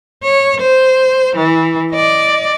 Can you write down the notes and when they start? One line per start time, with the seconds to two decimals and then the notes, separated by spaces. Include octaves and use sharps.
0.24 C#5
0.61 C5
1.37 E3
1.92 D5 D#5